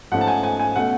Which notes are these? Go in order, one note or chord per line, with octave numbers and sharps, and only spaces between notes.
G#2 F3 A3 C#4 F#5
A5
G#5
G#5
G#5
B2 A3 C#4 F#5